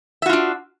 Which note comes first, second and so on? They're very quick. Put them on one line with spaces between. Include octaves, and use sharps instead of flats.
E5 F#4 F4 D4